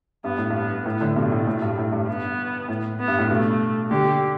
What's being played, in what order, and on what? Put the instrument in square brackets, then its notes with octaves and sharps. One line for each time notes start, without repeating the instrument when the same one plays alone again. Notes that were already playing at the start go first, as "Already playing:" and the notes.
[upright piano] G2 [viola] B3
[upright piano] A2
[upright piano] G2 [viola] B3
[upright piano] A2 [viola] B3
[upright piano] A2 D3
[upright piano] G2 B2 [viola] A3
[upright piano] A2
A2
G2
A2
G2
[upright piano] G2 [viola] B3
[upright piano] A2
[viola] B3
[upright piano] G2
A2
[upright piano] G2 B2 [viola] A3
[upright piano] D3 G3 [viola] G4